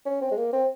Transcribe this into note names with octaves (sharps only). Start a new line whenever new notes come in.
C#4
C4
G#3
A#3
C4